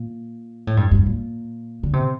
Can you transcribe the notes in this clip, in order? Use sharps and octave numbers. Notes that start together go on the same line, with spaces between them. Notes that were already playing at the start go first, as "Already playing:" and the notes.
Already playing: A#2
A2
G2
G2
A#2
D3
C3